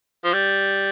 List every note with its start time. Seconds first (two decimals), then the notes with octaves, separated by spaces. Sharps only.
0.24 F3
0.33 G3